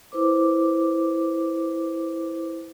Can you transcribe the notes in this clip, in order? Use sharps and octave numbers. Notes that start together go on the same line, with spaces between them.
E4 B4 C5 D6